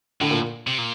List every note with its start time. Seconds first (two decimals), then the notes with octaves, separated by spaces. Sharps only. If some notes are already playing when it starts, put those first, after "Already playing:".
0.21 A2 D3
0.31 A#2
0.67 C3
0.78 A#2